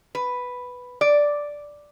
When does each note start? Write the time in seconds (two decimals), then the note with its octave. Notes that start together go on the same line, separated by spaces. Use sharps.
0.15 B4
1.01 D5